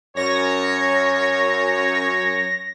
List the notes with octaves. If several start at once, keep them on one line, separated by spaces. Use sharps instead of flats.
F#2 C#5 A#6